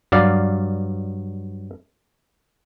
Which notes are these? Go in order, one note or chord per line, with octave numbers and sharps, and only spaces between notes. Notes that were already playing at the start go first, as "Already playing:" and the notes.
G2 F#3 D5 F5